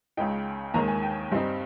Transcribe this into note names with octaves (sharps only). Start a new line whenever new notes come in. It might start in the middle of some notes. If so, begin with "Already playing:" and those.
C#2 C#3 G#3 D#4 G5
D#2 D#3 G#3 A#5
G#5
G5
G2 G3 C4 D#4